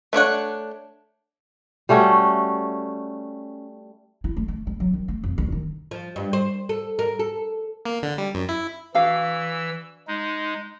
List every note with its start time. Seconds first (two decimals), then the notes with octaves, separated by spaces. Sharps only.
0.13 A3 D4 C#5 F#5
1.89 G3 A3 C#4 F#4
4.24 E4
4.37 A3
4.48 A3
4.67 G#3
4.80 F#3
4.94 D#3
5.08 A3
5.24 F2
5.38 D2
5.52 D#3
5.91 F3
6.16 G2
6.33 C5
6.69 A4
6.99 A#4
7.19 A4
7.85 A#3
8.03 D3
8.18 G3
8.35 F#2
8.49 E4
8.95 E3 D4 F#4 F5 E6
10.07 G#3 D#4